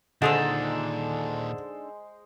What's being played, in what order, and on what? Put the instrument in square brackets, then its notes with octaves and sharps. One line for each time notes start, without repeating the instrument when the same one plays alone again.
[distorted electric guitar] A#2 D#3 [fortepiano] D3 [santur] G#3 C5 [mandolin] D4 D#4 A4